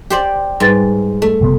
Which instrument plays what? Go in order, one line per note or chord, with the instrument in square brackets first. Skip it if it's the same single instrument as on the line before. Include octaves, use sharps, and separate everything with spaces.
[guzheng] G4 C5 D5
[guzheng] G#2 [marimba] G3 B4 A6
[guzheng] A3
[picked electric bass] F#1 C3 B3